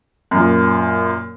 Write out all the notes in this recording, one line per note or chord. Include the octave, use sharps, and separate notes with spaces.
F#2 A#2